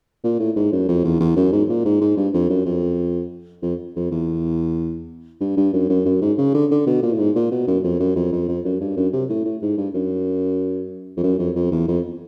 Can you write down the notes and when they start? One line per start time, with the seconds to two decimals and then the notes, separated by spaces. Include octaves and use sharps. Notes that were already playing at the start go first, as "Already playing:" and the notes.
0.24 A#2
0.39 A2
0.56 G#2
0.72 F#2
0.89 F2
1.04 E2
1.20 E2
1.37 F#2
1.52 G#2
1.69 A#2
1.85 G#2
2.01 G#2
2.17 G2
2.34 F2
2.50 F#2
2.66 F2
3.62 F2
3.96 F2
4.11 E2
5.41 G2
5.57 G2
5.73 F#2
5.89 F#2
6.05 F#2
6.21 G#2
6.38 C#3
6.54 D3
6.71 D3
6.87 B2
7.03 A#2
7.13 A2
7.19 G#2
7.36 A#2
7.51 B2
7.67 F#2
7.84 F2
8.00 F#2
8.16 F2
8.32 F2
8.48 F2
8.65 F#2
8.80 G2
8.97 F#2
9.13 C3
9.29 A2
9.45 A2
9.62 G#2
9.78 G2
9.94 F#2
11.17 F2
11.23 F#2
11.39 F2
11.56 F2
11.72 E2
11.88 F2